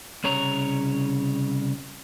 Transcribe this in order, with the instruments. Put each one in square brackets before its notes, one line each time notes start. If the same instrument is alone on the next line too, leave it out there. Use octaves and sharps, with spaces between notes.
[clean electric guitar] C2 C#3 C#5 A#5